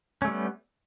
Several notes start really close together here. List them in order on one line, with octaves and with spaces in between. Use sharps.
C#4 A3 G3 B3